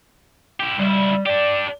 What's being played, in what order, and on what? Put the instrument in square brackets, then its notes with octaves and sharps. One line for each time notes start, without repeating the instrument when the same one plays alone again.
[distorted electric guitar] E4 G4
[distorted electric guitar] C#2 E4 [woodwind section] G3
[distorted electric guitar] D4 G4 [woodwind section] D5